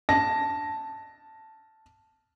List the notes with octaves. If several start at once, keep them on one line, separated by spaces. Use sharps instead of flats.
A5 A#6